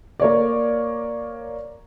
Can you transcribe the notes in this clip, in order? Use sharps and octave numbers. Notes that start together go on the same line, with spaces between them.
A#3 C#5 D5